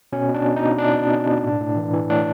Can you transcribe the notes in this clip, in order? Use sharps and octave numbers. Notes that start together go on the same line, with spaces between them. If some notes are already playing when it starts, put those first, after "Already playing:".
B2 C#4
B2
D4
B2
D#4
B2
B2 D4
B2
B2
B2
A2
A2
E3
E3
A2 D4